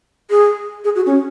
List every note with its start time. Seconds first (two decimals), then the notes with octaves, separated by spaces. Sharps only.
0.30 G#4
0.84 G#4
0.96 F#4
1.06 C#4